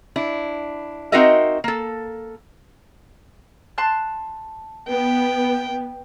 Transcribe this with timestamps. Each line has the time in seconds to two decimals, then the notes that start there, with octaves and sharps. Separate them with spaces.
0.16 D4 E4
1.12 C4 D#4 F#4 A#4 D#5 E5
1.64 A#3 A4
3.78 A5 C6 F#6
4.88 B3 G5